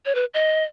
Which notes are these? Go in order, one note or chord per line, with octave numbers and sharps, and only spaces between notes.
C#5
B4
D#5